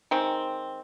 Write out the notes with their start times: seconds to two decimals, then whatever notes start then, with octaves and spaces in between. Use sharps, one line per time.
0.11 D#3 G#3 C4